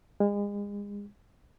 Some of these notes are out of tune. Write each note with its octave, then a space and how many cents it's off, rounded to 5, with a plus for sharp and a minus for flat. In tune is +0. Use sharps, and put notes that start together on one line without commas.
G#3 -35